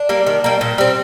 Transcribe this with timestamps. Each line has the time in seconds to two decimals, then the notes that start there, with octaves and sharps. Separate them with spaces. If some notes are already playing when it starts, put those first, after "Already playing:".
Already playing: D4
0.09 G3 A#3
0.27 D#3
0.44 G3 A#3
0.61 A#2
0.78 G3 C4